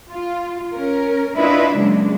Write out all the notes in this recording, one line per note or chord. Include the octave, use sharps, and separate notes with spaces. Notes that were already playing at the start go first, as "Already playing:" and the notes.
F4
C#4 A#4
D4 E4 F4 B4 D#5 E5
C#3 F#3 G#3 A#3 D4